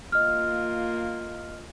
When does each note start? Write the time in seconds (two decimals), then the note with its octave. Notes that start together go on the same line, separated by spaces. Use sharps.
0.12 A#3 F4 D#5 F6